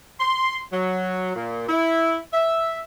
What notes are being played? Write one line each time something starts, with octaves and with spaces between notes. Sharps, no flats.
C6
F#3
A#2
E4
E5